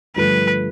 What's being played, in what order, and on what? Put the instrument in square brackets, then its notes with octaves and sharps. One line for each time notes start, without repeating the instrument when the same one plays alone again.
[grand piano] G2 D3 F3 A3 [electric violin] B4